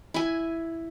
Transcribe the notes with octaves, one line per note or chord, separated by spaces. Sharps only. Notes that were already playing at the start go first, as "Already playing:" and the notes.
E4 G#5